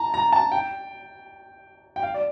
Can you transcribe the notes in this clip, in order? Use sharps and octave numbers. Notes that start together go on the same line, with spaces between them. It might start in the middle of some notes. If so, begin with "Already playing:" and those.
Already playing: A5 A#5
A#5
A5
G5
G5
F5
D5